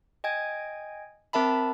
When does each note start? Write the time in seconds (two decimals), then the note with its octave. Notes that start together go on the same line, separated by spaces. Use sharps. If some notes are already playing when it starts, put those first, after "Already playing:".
0.24 D#5 G5 G#5 G#6
1.33 C4 A#4 E5 A5 B5